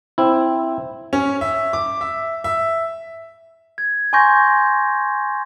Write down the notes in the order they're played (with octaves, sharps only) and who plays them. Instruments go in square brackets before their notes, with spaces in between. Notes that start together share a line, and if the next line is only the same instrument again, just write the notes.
[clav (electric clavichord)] C4 E4
[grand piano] C#4
E5
D6
E5
E5
[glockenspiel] G#6
G#5 C6 C#6 G6 A#6